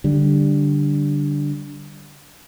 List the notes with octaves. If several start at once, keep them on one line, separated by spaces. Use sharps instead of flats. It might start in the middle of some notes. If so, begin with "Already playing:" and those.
D3 G3